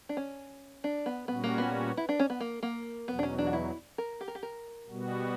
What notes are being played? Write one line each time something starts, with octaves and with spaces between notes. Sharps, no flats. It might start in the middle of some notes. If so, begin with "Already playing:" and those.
D4
C#4
D4
B3
A#2 G3 B3 C#4 F#4
A#3
B3
E4
D4
C#4
B3
A#3
A#3
E2 B2 F#3 B3
D4
C#4
D4
F#4
E4
A#4
G4
A#4
G4
A#4
B2 G3 B3 F#4